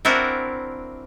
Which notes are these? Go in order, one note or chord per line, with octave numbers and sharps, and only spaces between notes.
C4 D4 E4 F#4 A#4